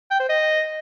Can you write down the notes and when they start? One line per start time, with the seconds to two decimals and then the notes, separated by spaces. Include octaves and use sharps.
0.11 G5
0.20 C5
0.29 D#5